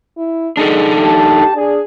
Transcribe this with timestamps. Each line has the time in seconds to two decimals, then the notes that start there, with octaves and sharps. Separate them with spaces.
0.18 E4
0.57 G#3 D4 D#4 A4
0.97 A3 G4 A5
1.55 D4 G#4